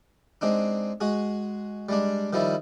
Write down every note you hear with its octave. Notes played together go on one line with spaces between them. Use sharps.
G#3 C4 D4 D#4
G#3 F#4 G#4
G3 G#3 D4
D#3 F3 G3 D#4 E4